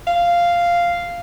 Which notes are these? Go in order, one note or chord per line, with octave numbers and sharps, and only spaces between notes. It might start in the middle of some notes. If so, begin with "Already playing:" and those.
F5